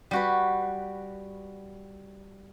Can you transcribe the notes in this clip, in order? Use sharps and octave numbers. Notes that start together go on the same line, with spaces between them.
G3 F#4 B4